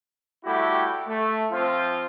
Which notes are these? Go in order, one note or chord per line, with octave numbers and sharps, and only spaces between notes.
G3 A3 E4 F#4 G4
A3
F3 C4 F4